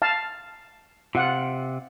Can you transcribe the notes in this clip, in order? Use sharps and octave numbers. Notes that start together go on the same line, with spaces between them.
F5 A5
C3 F4 F#5